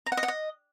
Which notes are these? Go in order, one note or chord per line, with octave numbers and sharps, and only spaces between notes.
A#5
F#5
D#5
F#5
D#5